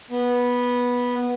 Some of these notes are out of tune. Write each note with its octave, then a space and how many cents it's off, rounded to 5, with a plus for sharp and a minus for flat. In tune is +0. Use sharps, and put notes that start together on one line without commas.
B3 -10